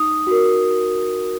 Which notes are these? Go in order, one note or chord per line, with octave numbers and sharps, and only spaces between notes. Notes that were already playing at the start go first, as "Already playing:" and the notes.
Already playing: D#4 D#6
F#4 A#4